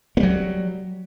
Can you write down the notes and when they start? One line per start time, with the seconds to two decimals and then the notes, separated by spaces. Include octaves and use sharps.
0.17 A#3
0.20 G3
0.23 F#3